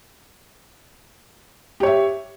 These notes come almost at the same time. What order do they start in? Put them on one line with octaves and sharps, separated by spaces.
G4 C#5 E5